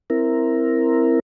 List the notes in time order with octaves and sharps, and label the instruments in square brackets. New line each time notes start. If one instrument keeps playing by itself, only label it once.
[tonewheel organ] C4 E4 A#4